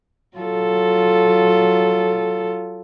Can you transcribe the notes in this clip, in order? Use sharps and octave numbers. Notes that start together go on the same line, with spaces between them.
F#3 F4 A4